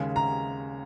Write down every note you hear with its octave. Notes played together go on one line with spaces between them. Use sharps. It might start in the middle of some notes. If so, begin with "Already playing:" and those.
Already playing: D#2 C#3 G#3 C#4
A#5